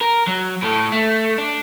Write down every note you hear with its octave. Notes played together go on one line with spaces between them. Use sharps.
A#4
F#3
A2 A4
A3
D4